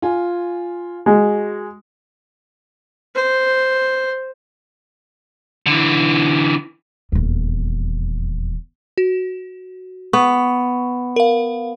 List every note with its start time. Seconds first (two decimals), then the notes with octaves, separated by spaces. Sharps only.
0.02 F4 G#5
1.06 G#3 F#4
3.15 C5
5.66 D3 E3
7.12 D#1 E2
8.98 F#4
10.13 B3 C#6
11.16 A#4 F5